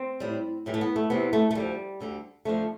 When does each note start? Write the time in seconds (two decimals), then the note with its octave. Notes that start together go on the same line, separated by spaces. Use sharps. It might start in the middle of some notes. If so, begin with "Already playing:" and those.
Already playing: C4
0.20 A2 G3
0.66 A2 E3 G3
0.74 A3
0.81 B3
0.96 A3
1.10 E2 C3 E3 G3 B3
1.33 A3
1.51 A3
1.55 D2 D3 F3 G3
2.01 D2 D3 G3
2.45 F2 D3 F3 A3